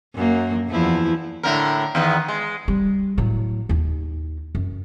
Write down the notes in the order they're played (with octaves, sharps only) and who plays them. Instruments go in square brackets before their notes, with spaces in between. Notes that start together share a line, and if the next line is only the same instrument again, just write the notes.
[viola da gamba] F#2 A#3
E2 F3 E4
[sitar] A2 D3 A#4
E2 D#3 B3
G#3
[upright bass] G3
A2 F#3
D#2 D#4
F#2